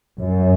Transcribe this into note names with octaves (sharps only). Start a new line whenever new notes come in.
F#2